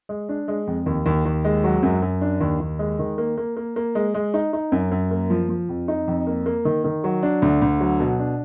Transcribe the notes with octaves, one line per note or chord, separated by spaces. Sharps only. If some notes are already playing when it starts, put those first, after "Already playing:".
G#3
D4
G#3
F2
D#2
D#2
D#2
G#3
F#3
F#2
F#2
D4
D#2
D#2
G#3
D#3
A#3
A#3
A#3
A#3
G#3
G#3
D#4
D#4
F#2
F#2
A#3
F3
F3
F2
D#4
F2
A#3
A#3
D#3
D#3
F#3
D4
D2
D2
F#3
B2
D4